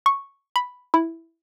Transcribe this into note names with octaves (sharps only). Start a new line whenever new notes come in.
C#6
B5
E4